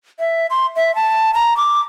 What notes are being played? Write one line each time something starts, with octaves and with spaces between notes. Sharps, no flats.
E5
C6
E5
A5
A#5
D6